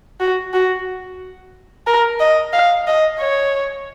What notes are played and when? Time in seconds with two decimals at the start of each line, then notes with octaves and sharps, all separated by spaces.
0.20 F#4
0.53 F#4
1.86 A#4
2.19 D#5
2.53 F5
2.87 D#5
3.20 C#5